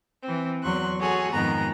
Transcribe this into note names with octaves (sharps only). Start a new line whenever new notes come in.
E3 C4
E2 F#3 C6 C#6 F#6
F#4 G#4 A4 C#5 F#5 G#5
F2 G#2 D#3 B3 A#5